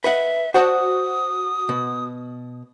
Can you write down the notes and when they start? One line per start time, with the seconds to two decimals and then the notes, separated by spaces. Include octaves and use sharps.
0.04 B4 D#5 E5 F#5
0.54 F#4 C5 D5 A5 D#6
1.69 B2